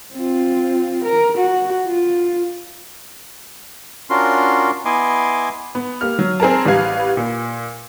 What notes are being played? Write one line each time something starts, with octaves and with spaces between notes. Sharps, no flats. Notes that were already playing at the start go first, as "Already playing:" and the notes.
C4 F4
A#4
F#4
F4
C#4 D4 F4 F#4 A#4 C6
B3 E4 D#5 G#5 C6 D6
B3
A#3 G4 F6
F#3
C4 G#4 A#4 A5
A1 G3 B4 F5 G#6
A#2